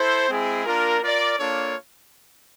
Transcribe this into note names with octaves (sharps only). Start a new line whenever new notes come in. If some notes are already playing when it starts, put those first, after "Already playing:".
Already playing: E4 A4 C5
G#3 C4 E4 G#4
A#3 D4 F4 A#4
F4 A#4 D5
A#3 D4 F4 A4 C#5